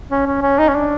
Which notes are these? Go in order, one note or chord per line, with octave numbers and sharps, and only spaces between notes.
C#4
C#4
C#4
D#4
C#4
D4